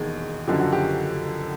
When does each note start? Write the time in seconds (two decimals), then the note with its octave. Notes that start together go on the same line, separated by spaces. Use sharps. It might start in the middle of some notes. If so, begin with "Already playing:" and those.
Already playing: E1 D#2 D#3 G#4
0.47 F#1 F#2 D3 F3 G4
0.60 F#4
0.72 G4